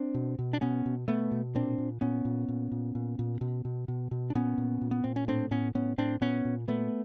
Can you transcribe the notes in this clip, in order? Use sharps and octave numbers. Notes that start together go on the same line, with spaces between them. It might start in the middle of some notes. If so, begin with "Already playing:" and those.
Already playing: C4 D4
B2
B2
D4
B2 B3 C#4
B2
B2 A3 B3
B2
A#2 C4 D4
A#2
A#2 B3 C#4
A#2
A#2
A#2
A#2
A#2
B2
B2
B2
B2
D4
A#2 B3 C#4
A#2
A#2
B3
A#2 C4
C#4
A2 C4 D4
A2 B3 C#4
A2 B3 C#4
A2 C4 D4
A#2 B3 C#4
A#2
A#2 A3 B3